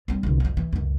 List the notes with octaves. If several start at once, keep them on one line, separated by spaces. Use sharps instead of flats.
G3 C4
C2 D3
F2 F3
E3
C#2 F#2